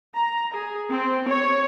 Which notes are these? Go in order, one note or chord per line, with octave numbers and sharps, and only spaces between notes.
A#5
G#4
C4
C#5